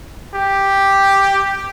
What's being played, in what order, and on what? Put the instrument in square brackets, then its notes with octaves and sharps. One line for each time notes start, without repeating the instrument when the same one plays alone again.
[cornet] G4